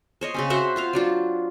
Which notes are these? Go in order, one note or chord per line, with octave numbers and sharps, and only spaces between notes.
C5 C#5 D#5
C#3 C4 C#4
F#4 C5 E5 F#5
F4 C5 F5
F#3 D4 F4